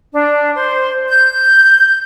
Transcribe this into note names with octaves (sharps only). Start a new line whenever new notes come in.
D4
C5
G6